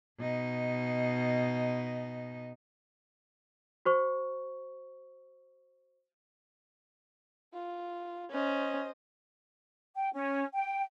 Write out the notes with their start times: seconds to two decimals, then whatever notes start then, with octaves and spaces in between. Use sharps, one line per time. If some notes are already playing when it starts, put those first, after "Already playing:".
0.19 B2 D#4
3.85 F#4 C5 C#6
7.54 F4
8.32 C#4 C5 D#5
9.95 G5
10.13 C#4
10.54 G5